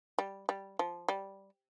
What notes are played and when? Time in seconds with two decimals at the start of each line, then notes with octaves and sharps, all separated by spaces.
0.18 G3
0.49 G3
0.79 F3
1.08 G3